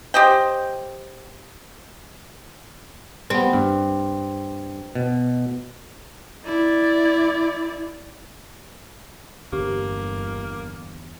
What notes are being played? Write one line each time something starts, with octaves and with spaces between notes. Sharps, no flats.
G4 C5 D#5 G5
G3 B3 C4
G2
B2
E4 D5
G1 E2 D3 A#3 C4 G4